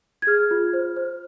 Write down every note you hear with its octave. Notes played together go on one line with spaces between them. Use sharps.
G#6
G#4 F6
F4
C5
C5